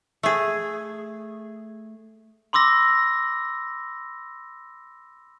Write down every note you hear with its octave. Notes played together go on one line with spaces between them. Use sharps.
A3 G#4
B5 C6 D6 E6 A#6